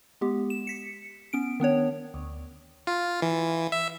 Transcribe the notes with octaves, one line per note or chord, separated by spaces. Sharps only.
G#3 B3 G4
E7
B6 C#7
B3 C#4 D7
D#3 B3 D4 C#5
D2
F4
E3
E5